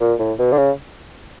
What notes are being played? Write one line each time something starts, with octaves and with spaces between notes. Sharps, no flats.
A#2
A2
B2
D3
C#3